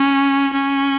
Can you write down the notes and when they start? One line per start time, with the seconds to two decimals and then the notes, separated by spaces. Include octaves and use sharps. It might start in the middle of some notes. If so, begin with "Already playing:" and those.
Already playing: C#4
0.53 C#4